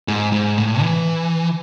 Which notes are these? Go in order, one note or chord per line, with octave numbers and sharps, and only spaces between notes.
G#2
G#2
A2
E3